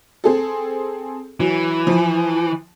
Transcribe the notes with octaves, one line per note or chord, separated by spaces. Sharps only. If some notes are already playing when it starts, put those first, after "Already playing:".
C4 G#4 A4
E3 F#3
F3